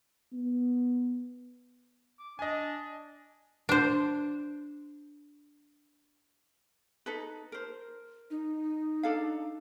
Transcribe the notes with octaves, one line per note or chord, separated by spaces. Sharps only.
B3
D6
D4 D#5 G#5
D4 C5
D#4 A4 B4
A#4 C5
D#4
D4 A4 F5